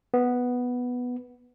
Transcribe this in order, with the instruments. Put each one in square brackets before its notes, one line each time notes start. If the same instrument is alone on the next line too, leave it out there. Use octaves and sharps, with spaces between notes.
[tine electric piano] B3